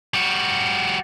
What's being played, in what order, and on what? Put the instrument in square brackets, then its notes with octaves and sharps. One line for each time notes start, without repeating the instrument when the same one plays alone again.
[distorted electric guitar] G3 F#4